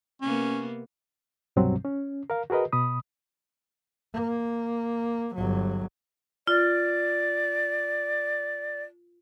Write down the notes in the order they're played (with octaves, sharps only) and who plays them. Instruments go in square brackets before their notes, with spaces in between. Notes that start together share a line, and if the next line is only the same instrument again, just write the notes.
[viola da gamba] C3 A#3 B3 [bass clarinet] C#4
[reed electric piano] C2 G2 B2 F#3 G3 C4
C#4
A#4 F5
F#4 G#4 A#4 B4 D#5
B2 B5 D#6
[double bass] A#3
G1 F#3
[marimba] F4 [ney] D5